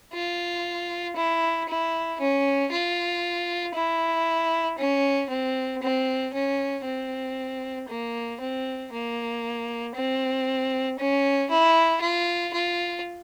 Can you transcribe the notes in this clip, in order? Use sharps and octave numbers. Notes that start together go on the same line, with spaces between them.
F4
E4
E4
C#4
F4
E4
C#4
C4
C4
C#4
C4
A#3
C4
A#3
C4
C#4
E4
F4
F4